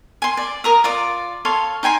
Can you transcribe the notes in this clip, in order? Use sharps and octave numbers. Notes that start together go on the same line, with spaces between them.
G#5 C6
D5
A#4 A#5 D#6
F4 D5 D6
A4 C#5 F5 C6
D#4 G5 G#5 C6